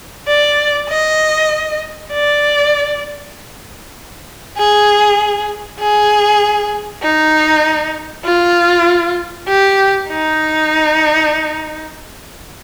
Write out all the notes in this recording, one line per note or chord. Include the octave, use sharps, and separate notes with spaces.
D5
D#5
D5
G#4
G#4
D#4
F4
G4
D#4